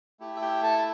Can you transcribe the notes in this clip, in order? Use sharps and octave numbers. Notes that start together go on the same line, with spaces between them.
A3 E4 G4
E5
G4 G5
A4 A5
A5